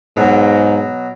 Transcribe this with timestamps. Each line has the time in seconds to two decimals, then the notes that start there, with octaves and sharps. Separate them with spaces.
0.17 G#2 B2 F#3